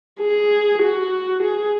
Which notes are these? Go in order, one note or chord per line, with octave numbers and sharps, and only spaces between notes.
G#4
F#4
G#4